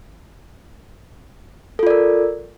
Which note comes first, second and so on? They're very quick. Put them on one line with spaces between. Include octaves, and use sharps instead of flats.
A4 F4 D5 A#4